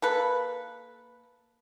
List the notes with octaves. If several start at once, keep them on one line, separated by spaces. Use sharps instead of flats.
A#3 A4 B4